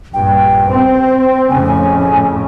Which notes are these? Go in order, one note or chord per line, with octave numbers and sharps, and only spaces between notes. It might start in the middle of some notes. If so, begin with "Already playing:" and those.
A#1 G2 G5
C4
F2 A2 C#3 G#5